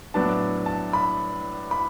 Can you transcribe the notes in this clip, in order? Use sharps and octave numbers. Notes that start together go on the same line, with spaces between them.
A2 F#3 B3 D4 A5
A5
B5
B5